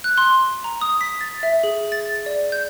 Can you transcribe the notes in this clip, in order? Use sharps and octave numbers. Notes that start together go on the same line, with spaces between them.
F#6
C6
A#5
D#6
B6
A6
E5
G#4
A6
D5
G6